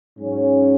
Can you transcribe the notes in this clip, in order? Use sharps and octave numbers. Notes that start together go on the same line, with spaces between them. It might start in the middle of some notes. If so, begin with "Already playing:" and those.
G#2 F#3 C#4